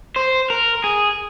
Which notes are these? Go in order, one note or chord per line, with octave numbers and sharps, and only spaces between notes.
C5
A#4
G#4